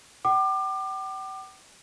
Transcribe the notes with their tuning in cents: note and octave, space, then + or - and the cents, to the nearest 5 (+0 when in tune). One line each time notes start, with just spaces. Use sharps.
G5 -45 D6 +30